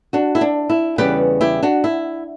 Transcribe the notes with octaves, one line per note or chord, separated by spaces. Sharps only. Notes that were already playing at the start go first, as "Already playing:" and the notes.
D4 F#4
E4
D4
E4
E2 C#3 G3 G4 B4
E4 G4
D4 F#4
E4